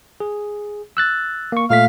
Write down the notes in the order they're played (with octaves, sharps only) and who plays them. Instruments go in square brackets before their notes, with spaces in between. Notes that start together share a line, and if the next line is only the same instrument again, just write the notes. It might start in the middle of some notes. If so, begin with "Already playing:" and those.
[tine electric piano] G#4
E6 F#6 A6
A#3 C#6
[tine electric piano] A#2 A3 B6 [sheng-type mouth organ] F5